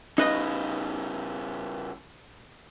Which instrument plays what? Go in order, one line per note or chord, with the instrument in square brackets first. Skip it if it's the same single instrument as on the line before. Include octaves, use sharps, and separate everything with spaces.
[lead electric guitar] C#3 G3 [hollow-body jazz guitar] D#4 B4 D#5